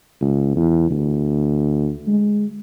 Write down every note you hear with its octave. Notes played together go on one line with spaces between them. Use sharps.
C#2
E2
D2
G#3